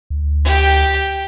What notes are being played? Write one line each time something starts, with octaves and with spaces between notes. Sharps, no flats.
D2
G4 G5